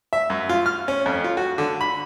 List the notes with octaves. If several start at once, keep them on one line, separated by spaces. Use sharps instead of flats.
E5
F#2
F4
F6
C#4
F2
F4
F#4
D3
B5